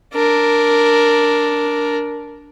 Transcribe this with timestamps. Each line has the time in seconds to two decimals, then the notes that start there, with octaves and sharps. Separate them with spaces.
0.13 D4 A#4